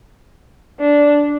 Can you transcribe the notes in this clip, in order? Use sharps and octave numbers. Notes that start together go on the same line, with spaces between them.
D4